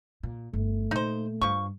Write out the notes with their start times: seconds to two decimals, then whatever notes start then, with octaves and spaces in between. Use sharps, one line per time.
0.23 A#2
0.54 G1 A3
0.91 A#2 A#3 D#4 C5
1.41 G2 F3 C#6